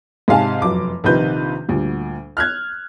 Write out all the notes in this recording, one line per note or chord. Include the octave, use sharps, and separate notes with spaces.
G#2 C3 F5 G#5 A5
F1 F#2 D6
A#1 C3 D#3 B4 G6
D2 A#2 G3
F6 F#6 G#6